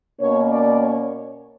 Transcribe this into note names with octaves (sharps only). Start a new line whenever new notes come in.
B2 A#3 C#4 C#5
D5
C#5